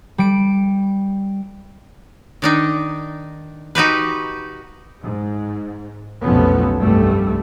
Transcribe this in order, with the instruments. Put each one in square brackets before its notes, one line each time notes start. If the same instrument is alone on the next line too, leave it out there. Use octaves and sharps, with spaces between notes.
[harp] G3 D7
[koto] D#3 D4 D#4
D#4 F#4 G4 B4
[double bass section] G#2
F1 B1 F3 A3 B3 C#4
F1 C2 G2 G3 A3